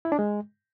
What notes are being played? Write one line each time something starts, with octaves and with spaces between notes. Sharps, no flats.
E4
D4
G#3